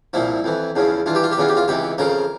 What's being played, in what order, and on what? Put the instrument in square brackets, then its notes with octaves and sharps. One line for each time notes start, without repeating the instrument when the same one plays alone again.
[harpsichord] C2 A#2 F3 E4
F2 E3
E2 C#3 F3
G2 E3 F4
G4
F4
G4
E2 C#3 E3 F4
G4
F4
C#2 C3 E3 G4
F2 C#3 F3 A#4